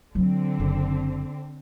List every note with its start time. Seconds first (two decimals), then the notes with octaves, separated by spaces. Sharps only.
0.15 D3 F#3 C4 F4
0.60 F#1